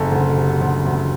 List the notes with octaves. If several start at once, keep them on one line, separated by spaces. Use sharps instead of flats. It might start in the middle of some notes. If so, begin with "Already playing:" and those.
Already playing: F#1 A4
D2
C3
D2
D2